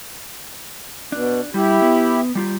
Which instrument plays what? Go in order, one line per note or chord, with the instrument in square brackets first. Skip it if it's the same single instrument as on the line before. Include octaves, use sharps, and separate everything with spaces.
[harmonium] B2 [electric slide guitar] D4
[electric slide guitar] G3 [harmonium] E4 G4
[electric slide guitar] B3
G3 F4 G4